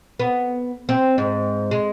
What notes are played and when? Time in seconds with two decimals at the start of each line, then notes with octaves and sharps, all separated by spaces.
0.19 B3
0.89 C4
1.18 G#2
1.71 G#3